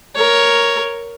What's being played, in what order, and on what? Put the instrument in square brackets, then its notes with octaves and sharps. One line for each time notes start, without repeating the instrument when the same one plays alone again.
[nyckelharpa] A#4 C#5